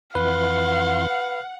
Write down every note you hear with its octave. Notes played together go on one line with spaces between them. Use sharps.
F2 E3 B4 F5 F#5 C6